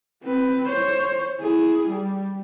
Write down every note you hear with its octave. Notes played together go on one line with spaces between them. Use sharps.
C4 B4
C5 C#5
E4 G#4
G3